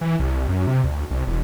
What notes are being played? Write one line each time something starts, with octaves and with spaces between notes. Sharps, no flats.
E3
C2
F#2
C3
D2
C2
E1